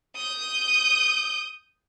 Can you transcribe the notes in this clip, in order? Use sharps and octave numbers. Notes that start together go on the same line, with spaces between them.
D#6 G6